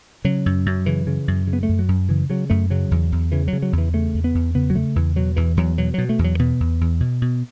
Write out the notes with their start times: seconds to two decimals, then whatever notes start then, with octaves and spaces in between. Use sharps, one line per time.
0.25 C#3 F#3
0.46 F#2
0.66 F#2
0.86 C#3 E3
1.07 C#3
1.28 F#2
1.47 C#3
1.53 B3
1.63 A3
1.69 F#2
1.79 F#3
1.88 F#2
2.09 C#3 E3
2.30 C#3 F#3
2.50 F#2 A3
2.70 C#3 F#3
2.91 E2
3.12 E2
3.32 C#3 E3
3.48 F#3
3.53 C#3
3.62 F#3
3.73 E2
3.78 E3
3.94 C#3 A3
4.14 E2
4.24 B3
4.34 E2
4.55 C#3 B3
4.70 F#3
4.75 C#3 A3
4.96 E2 E3
5.16 B2 F#3
5.36 E2 E3
5.57 E2 F#3
5.78 B2 F#3
5.94 B2 F#3
6.09 A3
6.19 E2
6.24 F#3
6.39 B2 B3
6.60 E2
6.81 E2
7.00 B2
7.22 B2